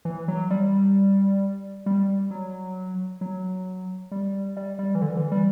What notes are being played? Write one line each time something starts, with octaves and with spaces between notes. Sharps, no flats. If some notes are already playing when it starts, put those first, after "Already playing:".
E3
F#3
G3
G3
F#3
F#3
G3
G3
G3
E3
D3
E3
G3